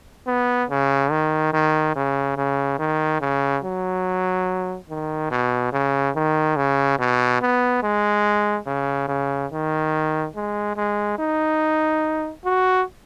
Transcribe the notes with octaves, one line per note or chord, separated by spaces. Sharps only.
B3
C#3
D#3
D#3
C#3
C#3
D#3
C#3
F#3
D#3
B2
C#3
D#3
C#3
B2
B3
G#3
C#3
C#3
D#3
G#3
G#3
D#4
F#4